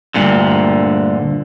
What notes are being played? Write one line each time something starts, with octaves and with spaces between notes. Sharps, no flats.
D2 G2 A#2 D3